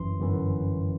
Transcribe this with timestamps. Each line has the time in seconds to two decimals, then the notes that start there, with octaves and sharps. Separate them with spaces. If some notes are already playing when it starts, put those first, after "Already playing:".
Already playing: G1 F#2 E3 C6
0.18 G1 F#2 E3